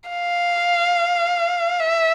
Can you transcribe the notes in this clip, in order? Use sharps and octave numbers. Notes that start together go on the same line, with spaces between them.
F5
E5